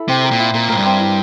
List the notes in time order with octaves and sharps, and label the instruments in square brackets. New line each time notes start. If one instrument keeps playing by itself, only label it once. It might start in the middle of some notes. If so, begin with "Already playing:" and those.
Already playing: [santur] E4 A4
[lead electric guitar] C3 [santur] C4
[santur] A#4
[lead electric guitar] A#2
[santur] E4
[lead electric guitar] A#2 [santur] A#4
[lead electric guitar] A2 [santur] A#4
[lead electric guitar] G2
[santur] C4
E4